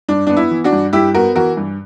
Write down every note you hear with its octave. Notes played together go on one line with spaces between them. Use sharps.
G2 D4
B3 D4
E4
E3
D4 F#4
G2
G2 E4 G4
B3 F#4 A#4
E3 F#4 A#4
G2